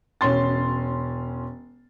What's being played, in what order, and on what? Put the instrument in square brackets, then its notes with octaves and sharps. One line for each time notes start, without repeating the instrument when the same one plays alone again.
[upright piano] E1 C#4 C6 A6